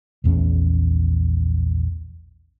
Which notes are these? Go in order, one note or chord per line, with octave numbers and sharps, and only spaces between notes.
A#1 E2 A3 C#4